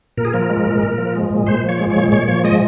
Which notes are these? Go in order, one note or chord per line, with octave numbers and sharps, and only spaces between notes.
A#2 A#4
G#4
F3 A#4
G#3
A#2
A#2
F3
G#3
A#2
A#2 C5
F3 C#5
G#3
C#5
A#2
A#2 C#5
F3 C#5
G#3 D#5